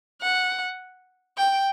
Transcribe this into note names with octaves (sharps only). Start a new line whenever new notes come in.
F#5
G5